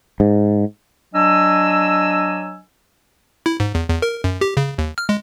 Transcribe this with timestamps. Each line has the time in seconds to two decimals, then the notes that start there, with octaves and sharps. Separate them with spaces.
0.20 G#2
1.14 F#3 D4 D#5 G#5 E6
3.46 E4
3.60 G#2
3.75 E2
3.89 E2
4.02 A#4
4.24 F#2
4.41 G4
4.57 C#3
4.78 D#2
4.98 F6
5.09 G#3